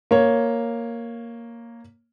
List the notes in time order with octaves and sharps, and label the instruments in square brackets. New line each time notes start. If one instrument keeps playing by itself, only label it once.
[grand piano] A#3 C#5